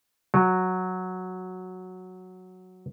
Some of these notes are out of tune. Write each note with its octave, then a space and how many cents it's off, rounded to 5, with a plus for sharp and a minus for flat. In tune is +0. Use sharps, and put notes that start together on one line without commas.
F#3 -5